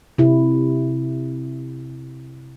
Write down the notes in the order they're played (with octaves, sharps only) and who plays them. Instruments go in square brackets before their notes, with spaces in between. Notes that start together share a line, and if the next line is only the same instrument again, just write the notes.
[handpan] C3 E4